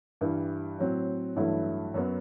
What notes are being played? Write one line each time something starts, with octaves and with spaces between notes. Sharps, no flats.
G2 E3 G3
A2 F#3 C4
A1 G2 F#3 A3 E4
F#2 F#3 B3